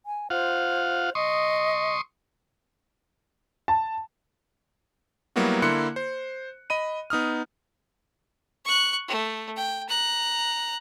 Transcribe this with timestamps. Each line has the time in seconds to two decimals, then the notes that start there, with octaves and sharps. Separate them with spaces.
0.06 G#5
0.30 F4 C5 F5 F#5
1.15 D#5 C6 C#6 D#6
3.68 A5
5.36 F#3 G3 A#3 B3 E4 F#4
5.62 D3 A#3 E4 C6 F#6 C#7
5.96 C5
6.70 D#5 B5 D#7
7.10 B3 D#4 D#6 F6
8.65 C#6 F#6
9.08 A3
9.56 G5
9.88 A#5 F#6